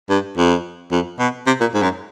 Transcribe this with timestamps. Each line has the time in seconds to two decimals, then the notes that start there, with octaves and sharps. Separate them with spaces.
0.10 G2
0.37 F2
0.91 F2
1.19 B2
1.47 C3
1.61 A#2
1.74 G#2
1.82 F#2